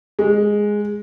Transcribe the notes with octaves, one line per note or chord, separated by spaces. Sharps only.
G#3